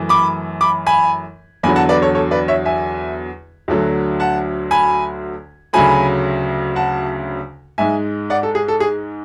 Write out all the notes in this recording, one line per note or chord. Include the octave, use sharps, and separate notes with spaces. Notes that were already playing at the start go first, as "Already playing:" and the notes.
Already playing: F#2 E3 A3
B5 D6
B5 D6
G#5 B5
E2 D3 F#3 G#5 B5
F#5 A5
B4 D5
A4 C#5
A4 C#5
B4 D5
C#5 E5
E5 G#5
D2 D3 F#3 A3
F#5 A5
G#5 B5
D2 C#3 F#3 A3 G#5 B5
F#5 A5
G#2 G#3 E5 G#5
D5 F#5
A4
G#4
A4
G#4